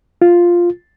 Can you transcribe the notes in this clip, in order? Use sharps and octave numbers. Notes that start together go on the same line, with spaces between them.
F4